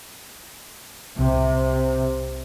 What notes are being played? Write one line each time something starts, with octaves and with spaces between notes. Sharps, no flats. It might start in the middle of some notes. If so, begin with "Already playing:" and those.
C2 C3